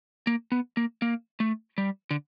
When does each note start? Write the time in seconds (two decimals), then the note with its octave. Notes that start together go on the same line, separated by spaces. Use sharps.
0.27 A#3
0.52 B3
0.77 A#3
1.02 A#3
1.40 A3
1.78 G3
2.11 D3